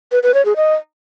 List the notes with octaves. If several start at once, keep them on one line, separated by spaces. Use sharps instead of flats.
B4
B4
C#5
G#4
D#5